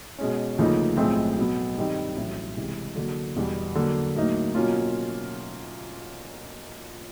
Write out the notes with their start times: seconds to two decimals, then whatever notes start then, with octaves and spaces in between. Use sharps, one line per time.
0.18 B2 G#3 C#4
0.58 D2 C#3 F3 A#3 D#4
0.97 B1 A2 F3 G#3 C4
1.37 B2 F#3 B3
1.77 G2 D#3 G3 C4 D#4
2.16 A1 A2 F#3
2.57 C#2 C3 E3
2.96 D3 F#3 A#3
3.36 E2 B2 G3 B3
3.75 D3 F#3 A#3
4.15 A2 F#3 A#3 D#4
4.54 B2 F#3 A#3 C#4 F4